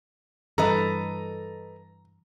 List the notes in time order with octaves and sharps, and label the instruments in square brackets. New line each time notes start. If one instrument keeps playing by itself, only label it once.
[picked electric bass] G2 E3 [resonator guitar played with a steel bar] A4 B4 D#5 [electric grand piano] A#5